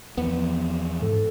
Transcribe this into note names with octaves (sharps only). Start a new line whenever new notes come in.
E2 F3 B3
G#2 A4